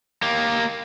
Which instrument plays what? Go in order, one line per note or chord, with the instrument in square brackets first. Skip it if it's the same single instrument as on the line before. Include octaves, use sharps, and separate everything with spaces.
[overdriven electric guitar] A#3 G4